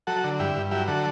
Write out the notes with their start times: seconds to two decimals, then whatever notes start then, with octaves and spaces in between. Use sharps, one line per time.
0.07 F#3 F#4 A4
0.24 D3
0.39 G2 E4 G4
0.55 G2
0.71 F#3 E4 G4
0.88 D3 F#4 A4